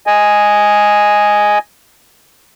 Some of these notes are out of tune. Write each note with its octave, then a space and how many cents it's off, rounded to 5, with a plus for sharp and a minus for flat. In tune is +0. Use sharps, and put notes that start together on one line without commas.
D#5 +0 G#5 +0